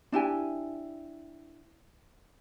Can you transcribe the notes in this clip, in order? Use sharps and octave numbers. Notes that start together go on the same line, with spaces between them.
D4 E4 G4 G#5